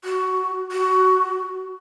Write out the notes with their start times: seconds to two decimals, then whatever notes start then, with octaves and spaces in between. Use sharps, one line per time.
0.05 F#4
0.72 F#4